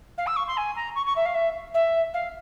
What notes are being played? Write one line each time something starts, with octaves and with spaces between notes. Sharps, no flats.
F5
E6
C#6
C6
G#5
A#5
C#6
C#6
E5
F5
E5
E5
F5